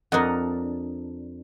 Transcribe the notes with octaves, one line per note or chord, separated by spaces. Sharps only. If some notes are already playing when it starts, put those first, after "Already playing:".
F2 D4 A#4 D#5 F#5